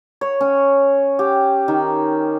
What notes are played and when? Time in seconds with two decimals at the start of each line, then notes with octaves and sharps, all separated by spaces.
0.21 C#5
0.41 C#4
1.19 G4
1.68 D#3